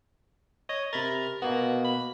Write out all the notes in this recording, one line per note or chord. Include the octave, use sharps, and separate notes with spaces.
C#5 D#5
C3 A#4 B5 A6
B2 A#3 B3 F#4
B5